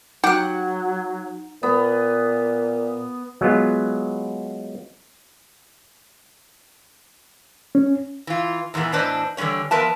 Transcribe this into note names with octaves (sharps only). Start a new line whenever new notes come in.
F#3 D#4 G4 F#5 F#6
A#2 B3
F#3 G#3 B3 F4
C#4
E3 F4
E2 A#2 E3 A#3 B3
E2 A2 D4 B4 C5 D#5
D3 E3 G3 C#4 C#5
F3 B3 A#4 B4 E5 A5